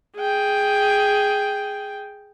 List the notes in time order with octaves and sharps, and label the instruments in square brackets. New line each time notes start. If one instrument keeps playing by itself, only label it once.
[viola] G#4 G5